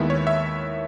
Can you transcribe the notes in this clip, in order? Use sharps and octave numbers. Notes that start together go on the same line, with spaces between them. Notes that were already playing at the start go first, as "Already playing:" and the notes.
Already playing: D#2 D#3 G#3 B3 E4 E5
C#5
E5